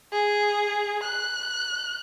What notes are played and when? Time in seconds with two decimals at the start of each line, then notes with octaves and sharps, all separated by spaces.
0.12 G#4
1.03 F#6